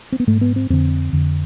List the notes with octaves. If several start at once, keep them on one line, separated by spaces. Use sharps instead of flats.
C4
B3
G#2 A3
B3
C4
F2 D3 C4
F2 D3